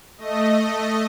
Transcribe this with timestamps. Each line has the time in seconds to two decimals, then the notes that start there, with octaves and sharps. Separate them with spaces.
0.18 A3 D#5